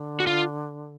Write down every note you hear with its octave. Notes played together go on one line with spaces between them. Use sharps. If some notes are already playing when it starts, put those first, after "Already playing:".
Already playing: D3
F#4
F4